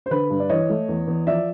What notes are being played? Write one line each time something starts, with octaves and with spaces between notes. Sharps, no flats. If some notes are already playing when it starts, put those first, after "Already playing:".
C5
D3 B4
G2
D5
E3 C#5 D#5
A3
E2
E2
F3 D5 E5